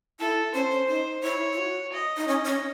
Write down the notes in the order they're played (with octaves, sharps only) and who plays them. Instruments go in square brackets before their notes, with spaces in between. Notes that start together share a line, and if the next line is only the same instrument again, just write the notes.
[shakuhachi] E4 [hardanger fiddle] A4
[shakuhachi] C#4 [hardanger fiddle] C5
[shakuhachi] C#4
[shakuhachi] D#4 [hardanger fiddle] C5
[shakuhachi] E4 [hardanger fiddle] C#5
[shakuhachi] E4
F#4
[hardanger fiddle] D#5
[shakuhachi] D#4
[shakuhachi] C#4 [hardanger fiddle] D#5
[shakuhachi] C#4